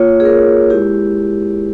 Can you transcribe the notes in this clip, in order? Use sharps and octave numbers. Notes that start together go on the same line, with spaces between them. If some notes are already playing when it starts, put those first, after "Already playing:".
Already playing: A#3 F4 C#5
G#4
A#4
G#3 E4 G4